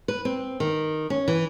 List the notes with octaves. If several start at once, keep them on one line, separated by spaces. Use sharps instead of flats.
B4
C4
D#3
C#4
E3